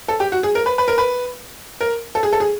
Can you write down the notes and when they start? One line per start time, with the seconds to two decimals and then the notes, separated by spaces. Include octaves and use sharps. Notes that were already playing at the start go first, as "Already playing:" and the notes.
0.08 A4
0.20 G4
0.32 F#4
0.43 G#4
0.55 A#4
0.66 B4
0.78 B4
0.88 A#4
0.98 B4
1.81 A#4
2.15 A4
2.23 G#4
2.32 A4
2.40 G#4